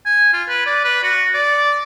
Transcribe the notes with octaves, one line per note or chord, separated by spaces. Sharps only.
G#5
F4
B4
D5
B4
F#4
D5